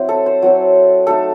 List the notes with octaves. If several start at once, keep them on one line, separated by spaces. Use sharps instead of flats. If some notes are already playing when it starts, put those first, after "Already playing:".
Already playing: F#3 C4 E4
A4
C5
F#3 C4 E4
A3 D#4 A4